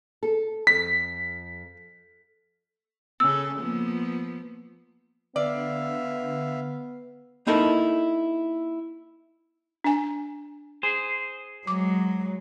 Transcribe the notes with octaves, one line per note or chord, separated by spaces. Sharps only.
A4
F2 B6
C#3 A4 E6
F3 A#3 B3
D3 B3 D5 E5 F5
A#3 D#4 E4 A4 A#4
D4 G#5
G#4 C5
F#3 G#3 D6